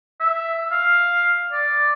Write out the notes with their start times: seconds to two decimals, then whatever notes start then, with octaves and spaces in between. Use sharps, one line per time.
0.20 E5
0.71 F5
1.52 D5